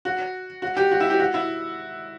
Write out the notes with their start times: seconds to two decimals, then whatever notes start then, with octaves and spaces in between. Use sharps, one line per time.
0.05 F#4
0.62 F#4
0.77 G4
0.92 F#4
1.00 E4
1.10 G4
1.20 F#4
1.34 E4